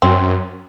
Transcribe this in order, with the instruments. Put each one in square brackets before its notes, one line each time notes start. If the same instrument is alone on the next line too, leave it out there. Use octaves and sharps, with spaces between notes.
[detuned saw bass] F#2 [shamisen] C4